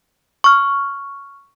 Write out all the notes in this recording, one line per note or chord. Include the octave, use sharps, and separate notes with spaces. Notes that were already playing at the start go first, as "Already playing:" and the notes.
C#6 F6